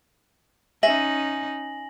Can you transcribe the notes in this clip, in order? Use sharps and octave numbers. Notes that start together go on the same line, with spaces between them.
C#4 D#4 E5 G#5 A#6 F#7